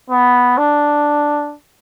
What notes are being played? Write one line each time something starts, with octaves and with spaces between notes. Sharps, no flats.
B3
D4